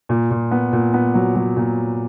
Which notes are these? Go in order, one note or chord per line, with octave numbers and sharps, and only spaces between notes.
A#2
A#2
B3
A#2
B3
F#3
F#3
A#2